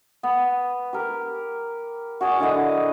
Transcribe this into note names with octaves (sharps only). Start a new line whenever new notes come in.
B3
G4 A#4
F#4 G#4 D5
D3 E4 D#5